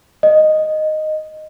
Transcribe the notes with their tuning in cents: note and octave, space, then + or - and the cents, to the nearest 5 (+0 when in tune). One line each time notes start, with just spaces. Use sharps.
D#5 -5